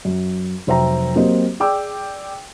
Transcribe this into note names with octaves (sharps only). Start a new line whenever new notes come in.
F#2
F1 F#3 C5 E5 G5 A#5
F#3 A#3 C4 G4 C5 D#5
G#4 D5 G5 D6 E6